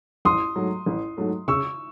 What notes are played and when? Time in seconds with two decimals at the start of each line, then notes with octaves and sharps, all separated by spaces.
0.25 A1 C6 D#6
0.56 G#2 F#3 A3
0.86 A1
1.17 G#2 F#3 A3
1.48 C#3 C#6 E6